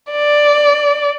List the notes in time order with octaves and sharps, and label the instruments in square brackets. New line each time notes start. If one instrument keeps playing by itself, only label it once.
[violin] D5